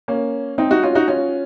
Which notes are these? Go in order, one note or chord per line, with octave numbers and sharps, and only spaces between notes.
A#3 C#4
C4 D#4
D#4 F#4
C#4 F4
D#4 F#4
C#4 F4